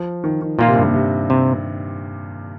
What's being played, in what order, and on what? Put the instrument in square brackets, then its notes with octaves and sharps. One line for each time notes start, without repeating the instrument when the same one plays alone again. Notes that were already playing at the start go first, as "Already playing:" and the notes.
Already playing: [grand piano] F3
D#3
D#3
[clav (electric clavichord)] A#2 A#3 F4 [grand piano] D#3
[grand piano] C3
G2
A#2
C3
[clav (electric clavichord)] C3